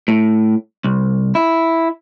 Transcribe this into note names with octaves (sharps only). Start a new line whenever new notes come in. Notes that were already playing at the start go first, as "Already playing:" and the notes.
A2
C2
E4